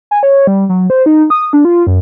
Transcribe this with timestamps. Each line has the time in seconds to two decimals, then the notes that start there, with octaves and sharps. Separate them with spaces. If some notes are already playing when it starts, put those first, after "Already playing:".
0.11 G#5
0.23 C#5
0.47 G3
0.69 F#3
0.90 C5
1.06 D#4
1.30 D#6
1.53 D4
1.65 F4
1.87 F#2